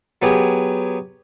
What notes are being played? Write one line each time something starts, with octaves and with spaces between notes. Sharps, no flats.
F#3 B3 G4 G#4